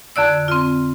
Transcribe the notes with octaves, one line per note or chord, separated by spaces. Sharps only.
F2 D3 D5 E6
C4 F4